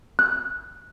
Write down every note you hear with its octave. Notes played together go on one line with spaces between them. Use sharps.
F#6